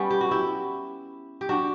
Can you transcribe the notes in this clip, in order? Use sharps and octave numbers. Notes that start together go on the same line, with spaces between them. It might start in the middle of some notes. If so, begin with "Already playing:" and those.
Already playing: G3 B3 C#4
G4
F#4
E4 G4
G4
D4 F#4